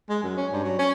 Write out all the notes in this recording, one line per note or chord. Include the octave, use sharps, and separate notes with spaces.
G#3
F#2
C#4
G2
F#3
C#4